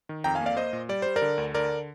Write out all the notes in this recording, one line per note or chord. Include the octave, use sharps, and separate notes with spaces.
D#3
F2 G5 A#5
F5 G#5
A#3
D5 F5
A#3 C5 D#5
A#2
G3 D5
G3 C5
A#4 D5
D3
D2
D3 A#4 D5